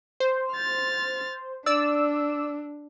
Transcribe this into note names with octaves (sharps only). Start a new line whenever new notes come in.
C5
F6 A6
D4 D5 E6